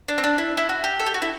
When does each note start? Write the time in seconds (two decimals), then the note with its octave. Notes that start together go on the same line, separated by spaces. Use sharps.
0.08 D4
0.18 C4
0.24 D4
0.38 E4
0.57 E4
0.69 F#4
0.84 G4
0.99 A4
1.06 G4
1.14 F#4
1.22 E4